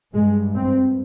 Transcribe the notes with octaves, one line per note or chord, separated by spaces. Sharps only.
G2 G#3
C4